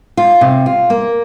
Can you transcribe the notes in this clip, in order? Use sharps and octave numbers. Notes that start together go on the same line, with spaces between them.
F4
C3
F4
A#3